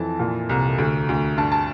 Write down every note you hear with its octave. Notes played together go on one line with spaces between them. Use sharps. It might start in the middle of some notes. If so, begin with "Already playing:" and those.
Already playing: F2 E3 A5
A#2
C2
D2
D2
G2 A5
A5